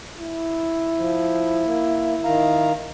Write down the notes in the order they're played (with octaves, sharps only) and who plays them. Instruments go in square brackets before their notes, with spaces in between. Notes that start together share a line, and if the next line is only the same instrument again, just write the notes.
[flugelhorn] E4
[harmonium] F3
A#3
D#3 F5 A#5